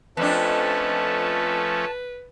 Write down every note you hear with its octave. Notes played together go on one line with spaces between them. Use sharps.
F2 F3 A3 C#4 D4 B4 A5